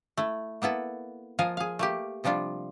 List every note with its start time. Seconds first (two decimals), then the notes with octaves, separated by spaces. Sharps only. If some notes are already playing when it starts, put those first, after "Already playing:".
0.17 A3 E4
0.62 A#3 B3 E4 A4
1.39 F3 F4 A#4 D#5 F5 G#5
1.57 G#4 F5
1.79 A3 A#3 G4
2.24 C3 F3 G3 D4 F4